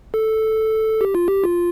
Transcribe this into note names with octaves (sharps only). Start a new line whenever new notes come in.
A4
G4
F4
G4
F4